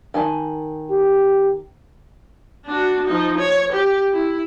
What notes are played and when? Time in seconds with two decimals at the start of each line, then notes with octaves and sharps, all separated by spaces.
0.14 D#3 G#5 A5
0.90 G4
2.66 D4 F#4
3.05 F3 D#4
3.38 C#5
3.72 G4
4.13 E4